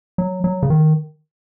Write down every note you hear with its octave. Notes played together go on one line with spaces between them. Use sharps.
F#3
F#3
C#3
D#3